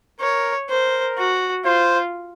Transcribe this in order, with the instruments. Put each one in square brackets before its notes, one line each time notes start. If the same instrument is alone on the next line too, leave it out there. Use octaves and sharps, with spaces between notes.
[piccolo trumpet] A#4 [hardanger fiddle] C#5
[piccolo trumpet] A#4 [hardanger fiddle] C5
[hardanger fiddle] F#4
[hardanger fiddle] F4 [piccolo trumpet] C5